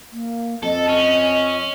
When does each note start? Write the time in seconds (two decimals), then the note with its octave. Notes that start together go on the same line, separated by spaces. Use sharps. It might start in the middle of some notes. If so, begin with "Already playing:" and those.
0.11 A#3
0.63 F2 A4 D#5
0.88 C#4